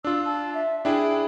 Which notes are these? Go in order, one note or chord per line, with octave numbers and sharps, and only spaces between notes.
D4 F4 E6
A5
E5
D4 E4 G#4 G5